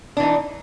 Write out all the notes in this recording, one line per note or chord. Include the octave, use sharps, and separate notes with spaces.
E3 D4 D#4